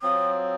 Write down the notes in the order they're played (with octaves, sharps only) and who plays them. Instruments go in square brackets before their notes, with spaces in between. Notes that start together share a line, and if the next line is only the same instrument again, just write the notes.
[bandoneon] F#3 C4 F4 [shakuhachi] D#6